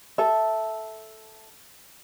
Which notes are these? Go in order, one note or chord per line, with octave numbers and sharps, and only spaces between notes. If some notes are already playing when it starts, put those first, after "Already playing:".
A4 E5